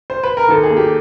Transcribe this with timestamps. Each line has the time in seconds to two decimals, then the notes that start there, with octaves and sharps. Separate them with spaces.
0.10 C5
0.23 B4
0.37 A#4
0.49 D#2 A4
0.64 G#4
0.70 A#3
0.77 G4